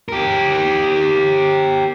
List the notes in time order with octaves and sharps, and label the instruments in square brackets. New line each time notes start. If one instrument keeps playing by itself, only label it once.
[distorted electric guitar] G4 A#4